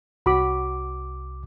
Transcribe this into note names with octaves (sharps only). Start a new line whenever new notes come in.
C2 F#4 B5 D6